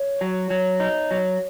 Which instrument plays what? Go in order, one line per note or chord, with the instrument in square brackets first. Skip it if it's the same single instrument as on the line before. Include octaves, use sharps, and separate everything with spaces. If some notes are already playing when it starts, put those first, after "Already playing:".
Already playing: [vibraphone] C#5
[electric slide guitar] F#3
F#3
D#4
F#3